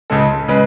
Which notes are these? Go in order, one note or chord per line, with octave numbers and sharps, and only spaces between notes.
C#2 C#3 G#3 A4
C#3 G#3 B4